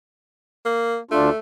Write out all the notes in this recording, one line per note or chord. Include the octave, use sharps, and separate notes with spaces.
A#3
D2 A3 D4 F4